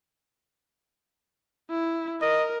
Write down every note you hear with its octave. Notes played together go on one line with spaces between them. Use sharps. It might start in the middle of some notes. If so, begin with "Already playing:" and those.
E4
A#4 D#5